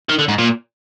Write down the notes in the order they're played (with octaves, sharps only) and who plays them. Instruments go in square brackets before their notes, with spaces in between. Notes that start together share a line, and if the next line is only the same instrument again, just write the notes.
[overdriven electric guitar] D#3
D3
G#2
A#2